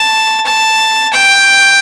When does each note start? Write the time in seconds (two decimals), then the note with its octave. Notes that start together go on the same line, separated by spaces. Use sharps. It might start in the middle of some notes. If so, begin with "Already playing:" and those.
Already playing: A5
0.46 A5
1.13 G5